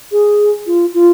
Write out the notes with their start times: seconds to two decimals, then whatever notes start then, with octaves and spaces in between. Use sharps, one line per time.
0.12 G#4
0.66 F4
0.94 F4